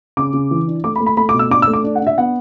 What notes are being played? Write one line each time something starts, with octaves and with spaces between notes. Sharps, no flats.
C#3 D6
C#3
E3
D4
A3 D6
B5
A3
B5
A3 B5
D6
B2
E6
D4 D6
E6
A3
D6
D4
F#5
D4
E5
B3 F#5